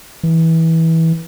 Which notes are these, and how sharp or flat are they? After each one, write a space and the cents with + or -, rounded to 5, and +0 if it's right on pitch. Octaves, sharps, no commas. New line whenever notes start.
E3 -20